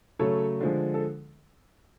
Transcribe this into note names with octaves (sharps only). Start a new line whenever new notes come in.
C#3 F#3 A3 A4 C#5
D3 F3 G#3
A4